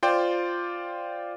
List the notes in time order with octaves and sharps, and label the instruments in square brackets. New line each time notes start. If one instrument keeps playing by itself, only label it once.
[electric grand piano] F4 C5 D5 G5